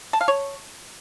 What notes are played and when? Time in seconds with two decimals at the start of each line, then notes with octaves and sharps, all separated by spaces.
0.13 A5
0.21 F5
0.28 C#5